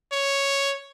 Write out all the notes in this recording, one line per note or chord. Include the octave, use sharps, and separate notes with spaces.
C#5